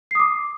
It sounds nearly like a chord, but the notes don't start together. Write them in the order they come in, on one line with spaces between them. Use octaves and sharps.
C7 D#6 D6